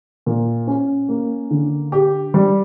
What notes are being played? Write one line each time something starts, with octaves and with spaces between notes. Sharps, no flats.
A#2
C#4
A#3
D3
G4
G3